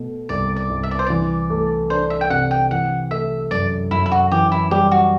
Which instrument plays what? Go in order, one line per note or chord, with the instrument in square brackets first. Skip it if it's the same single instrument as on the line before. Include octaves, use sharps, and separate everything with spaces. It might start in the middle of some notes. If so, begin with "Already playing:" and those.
Already playing: [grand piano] B2 A3
[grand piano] C2 [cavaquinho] D5
[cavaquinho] D5
[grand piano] C2
[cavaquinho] E5
D5
C5
[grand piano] E3 [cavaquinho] D5
[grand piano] A3
[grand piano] D4 [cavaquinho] C5
[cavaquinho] E5
G5
[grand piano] C3 [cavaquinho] F#5
[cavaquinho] G5
[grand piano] E3 [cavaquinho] F#5
[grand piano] A3 [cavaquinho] E5
[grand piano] F#2 [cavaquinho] D5
[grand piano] F#2 [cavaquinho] E4
[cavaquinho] E4
F#4
[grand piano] E3 [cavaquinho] G4
[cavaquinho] E4
[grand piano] G3 [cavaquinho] G4
[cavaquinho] F#4